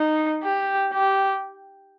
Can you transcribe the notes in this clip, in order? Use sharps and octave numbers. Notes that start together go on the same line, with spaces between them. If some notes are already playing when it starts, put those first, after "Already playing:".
Already playing: D#4
G4
G4